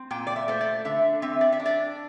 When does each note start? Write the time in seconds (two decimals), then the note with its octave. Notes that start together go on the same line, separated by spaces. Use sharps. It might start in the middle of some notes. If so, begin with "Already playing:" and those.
Already playing: C4
0.11 A#2 G5
0.27 D5
0.36 E5
0.48 A3 C5
0.61 D5
0.85 D3 E5
1.22 C4 E5
1.41 D5
1.52 E5
1.60 D4
1.66 D5